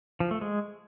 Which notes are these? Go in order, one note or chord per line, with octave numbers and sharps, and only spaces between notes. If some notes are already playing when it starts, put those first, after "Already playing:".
F3
A3
G#3